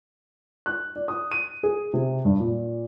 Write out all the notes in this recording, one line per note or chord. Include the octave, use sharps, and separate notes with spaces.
F#6
D5
D#6
D#7
G#4
C3
G2
A#2